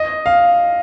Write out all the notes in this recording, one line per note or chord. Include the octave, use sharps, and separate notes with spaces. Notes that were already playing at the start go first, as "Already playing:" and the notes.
Already playing: D#5
F5